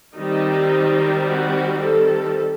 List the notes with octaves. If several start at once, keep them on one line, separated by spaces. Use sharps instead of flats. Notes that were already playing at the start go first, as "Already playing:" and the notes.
D#3 G3 C4 D#4
F#4
A4